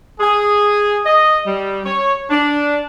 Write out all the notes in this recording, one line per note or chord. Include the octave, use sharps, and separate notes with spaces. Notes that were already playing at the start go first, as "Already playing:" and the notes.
G#4
D#5
G3
C#5
D4